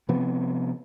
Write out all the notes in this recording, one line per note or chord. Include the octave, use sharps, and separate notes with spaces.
C3 F3 B3 C4